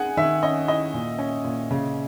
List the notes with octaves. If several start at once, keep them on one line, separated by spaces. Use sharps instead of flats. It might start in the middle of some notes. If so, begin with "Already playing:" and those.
Already playing: D#4 G#4 F#5 G#5
D#3 E5
C#4 D#5
E4 D#5
A#2
C#4
A#2
C#3